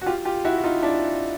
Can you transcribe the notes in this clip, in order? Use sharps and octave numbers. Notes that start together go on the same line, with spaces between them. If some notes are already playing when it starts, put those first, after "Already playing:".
F#4
F4 G4
F4 G4
E4 F#4
F#4
D#4 F4
D4 E4